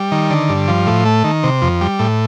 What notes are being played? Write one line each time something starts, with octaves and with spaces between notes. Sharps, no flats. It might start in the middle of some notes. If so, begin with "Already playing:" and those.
Already playing: G3
D#3
D3
G2
F3
A2
A3
D#3
C3
F2
G3
A2